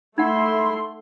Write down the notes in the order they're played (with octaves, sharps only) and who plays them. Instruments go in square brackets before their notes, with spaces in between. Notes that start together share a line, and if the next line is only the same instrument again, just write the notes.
[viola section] A3 C6 [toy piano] D#4 F#5 [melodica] E4